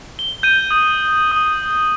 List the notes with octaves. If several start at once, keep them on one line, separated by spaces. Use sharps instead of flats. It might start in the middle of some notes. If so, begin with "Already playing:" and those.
G7
G6 D#7
D#6 G6
D#6